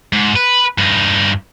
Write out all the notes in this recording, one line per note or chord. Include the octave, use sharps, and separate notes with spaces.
G#2
B4
G2 D#4